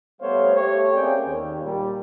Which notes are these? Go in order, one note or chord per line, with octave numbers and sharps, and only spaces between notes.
G3 A3 B3 C5 C#5 F5
A3 G4 C#5
A#3 C4 C#4 G#4 D5 G5
D#2
A#2 G3